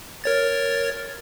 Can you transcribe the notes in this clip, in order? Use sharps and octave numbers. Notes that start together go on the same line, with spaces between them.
A#4 C#5 A6